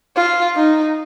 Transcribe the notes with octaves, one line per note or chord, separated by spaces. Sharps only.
F4
D#4